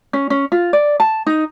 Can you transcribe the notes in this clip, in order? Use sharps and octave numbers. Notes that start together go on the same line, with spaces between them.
C#4
C#4
F4
D5
A5
D#4